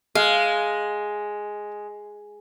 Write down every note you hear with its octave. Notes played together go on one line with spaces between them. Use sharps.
G#3 F5